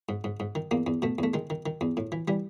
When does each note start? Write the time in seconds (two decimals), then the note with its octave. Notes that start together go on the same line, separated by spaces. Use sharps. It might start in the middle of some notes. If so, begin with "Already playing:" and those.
0.09 G#2
0.24 G#2
0.40 G#2
0.55 D#3
0.71 E2 A#3
0.87 E2
1.02 B2 A3
1.19 E2 A3
1.34 D#3 G#3
1.50 D#3
1.66 D#3
1.81 E2
1.97 A2
2.12 E3
2.28 E3 G3